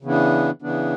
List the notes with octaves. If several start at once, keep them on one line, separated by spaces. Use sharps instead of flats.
C#3 E3 B3 D4
C#3 E3 B3 D4